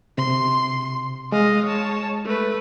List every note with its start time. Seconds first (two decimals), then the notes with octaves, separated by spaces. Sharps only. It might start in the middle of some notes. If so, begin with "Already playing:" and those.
0.18 C3 C6
1.32 G#3 D#5 F5
1.66 C#5 A5
2.25 A3 B4